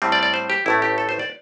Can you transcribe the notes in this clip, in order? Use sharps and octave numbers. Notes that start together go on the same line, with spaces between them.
A2 G3 C4
D5
D5
C5
G4
A1 A2 A3 E4
G4
A4
C5
D5